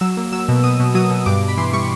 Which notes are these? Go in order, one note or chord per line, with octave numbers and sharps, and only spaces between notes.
F#3 E6
A#3
F#3 E6
B2
B2 D#6
B2
F#3 D#6
B2
G2 D6
G2
B5
E3 C6
G3 C#6